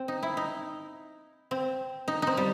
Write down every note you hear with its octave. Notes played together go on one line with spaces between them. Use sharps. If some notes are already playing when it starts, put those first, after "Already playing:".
Already playing: C4
D#4
E4
D#4
C4
D#4
C4 D#4
G3